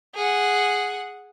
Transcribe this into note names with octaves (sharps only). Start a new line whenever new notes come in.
G#4 F#5